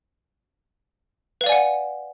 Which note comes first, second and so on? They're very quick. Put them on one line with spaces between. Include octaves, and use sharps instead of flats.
B4 F5 D5 G#5 F#5